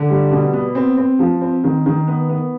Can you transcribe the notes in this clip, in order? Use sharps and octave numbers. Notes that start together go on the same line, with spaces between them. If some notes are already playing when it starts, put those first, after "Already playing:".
Already playing: D3
G3
B2
B3
C4
C4
F3
C4
D#3
D#3
B3
B3